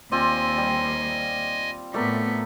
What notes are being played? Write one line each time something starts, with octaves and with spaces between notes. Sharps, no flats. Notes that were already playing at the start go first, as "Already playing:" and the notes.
D#2 C4 F4 D5 D#5 G#5
G3
A2 A3 B3 A#4 D5